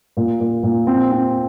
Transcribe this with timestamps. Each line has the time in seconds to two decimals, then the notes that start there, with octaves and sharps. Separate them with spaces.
0.17 A#2
0.40 A#2
0.63 A#2
0.87 C4
1.11 C4